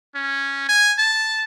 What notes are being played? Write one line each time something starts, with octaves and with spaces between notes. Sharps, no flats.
C#4
G#5
A5